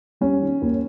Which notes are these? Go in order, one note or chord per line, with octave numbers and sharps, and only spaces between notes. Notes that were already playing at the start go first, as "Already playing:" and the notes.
G3 C#4
D#3
D#2